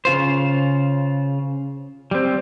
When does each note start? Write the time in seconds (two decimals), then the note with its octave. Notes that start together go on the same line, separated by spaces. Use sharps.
0.05 C#3 F4 C5
2.11 G3 C4